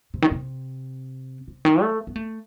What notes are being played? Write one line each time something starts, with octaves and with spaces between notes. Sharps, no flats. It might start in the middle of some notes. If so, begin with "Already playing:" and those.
C3
D#3
C3
C3
D#3
A3
B3
A3